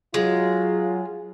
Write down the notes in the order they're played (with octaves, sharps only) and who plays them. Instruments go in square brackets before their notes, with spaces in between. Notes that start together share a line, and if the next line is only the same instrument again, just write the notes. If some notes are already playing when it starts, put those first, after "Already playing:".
[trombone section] F#3 F4 [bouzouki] G#3